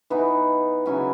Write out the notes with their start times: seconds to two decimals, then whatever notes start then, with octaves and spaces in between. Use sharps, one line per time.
0.10 E3 B3 D#4
0.86 C#3 F#3 C#4 E4 G#5